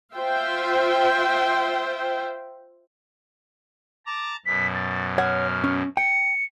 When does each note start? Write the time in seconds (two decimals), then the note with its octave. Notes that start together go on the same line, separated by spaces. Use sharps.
0.15 F4 C5 E5 G5
4.06 A5 A#5 D6
4.46 F#2 B2 B6
4.75 A6
5.18 C#5 F#5 F6
5.64 C#4
5.97 G5 C#7